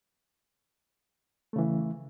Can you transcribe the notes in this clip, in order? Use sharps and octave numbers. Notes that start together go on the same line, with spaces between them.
C#3 E3 A3